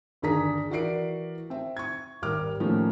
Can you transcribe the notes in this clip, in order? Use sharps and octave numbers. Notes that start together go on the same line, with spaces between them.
G1 D#2 D4 G#4 A#5 B6
E3 F#4 A#4 D5 C7 D7
C4 E5
C#6 G#6
G#1 D#2 G3 A#4 D6 F6
A2 D#3 F3 A3 A#3 C#4